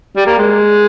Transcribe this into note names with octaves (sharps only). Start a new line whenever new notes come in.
G3
A#3
G#3